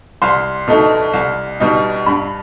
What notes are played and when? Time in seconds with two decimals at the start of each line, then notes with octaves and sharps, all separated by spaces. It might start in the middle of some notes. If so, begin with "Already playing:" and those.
0.22 C2 C6
0.68 B2 A3 D#4
1.13 C2
1.60 B2 G3 D#4
2.06 G2 B5